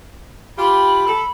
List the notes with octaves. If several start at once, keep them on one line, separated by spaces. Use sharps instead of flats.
F4 G4 B5
A4